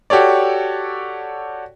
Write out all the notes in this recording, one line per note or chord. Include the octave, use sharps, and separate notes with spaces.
F#4 G4 A4 C#5 D5